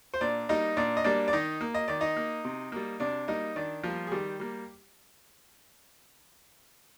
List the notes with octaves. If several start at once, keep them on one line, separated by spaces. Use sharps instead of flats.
C5
A#2 D4 D5
G3 A#3 D#4 D#5
A#2 D4 D5
D#5
G3 A#3 D4 D5
D5
D#3 D#4 D#5
A#3
D#5
D#3 D5
D#4 D#5
A#3
C3
G3 A#3
C3 D4 D5
G3 A#3 D#4 D#5
D#3 D4 D5
F3 G3 A#3 F4
G#4
D#3 G3 G4
G3 A#3